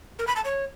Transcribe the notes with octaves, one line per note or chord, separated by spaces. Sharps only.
A#4
B5
A5
C#5